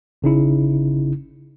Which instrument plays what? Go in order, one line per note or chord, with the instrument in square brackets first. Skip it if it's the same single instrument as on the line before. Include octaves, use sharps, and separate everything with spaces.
[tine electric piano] G#1 C#3 D#4 E4